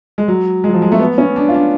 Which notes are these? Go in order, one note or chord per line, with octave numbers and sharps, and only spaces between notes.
G#3
F#3
G#3
F#3
F3
G#3
A3
B3
C#4
D4
F4
D4